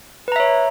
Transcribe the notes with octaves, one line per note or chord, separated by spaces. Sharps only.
B4 C#5 E5 A#5